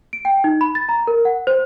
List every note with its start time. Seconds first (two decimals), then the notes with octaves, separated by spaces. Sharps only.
0.13 D7
0.25 G5
0.44 D#4
0.61 B5
0.75 A6
0.89 A#5
1.07 A#4
1.25 F#5
1.47 C5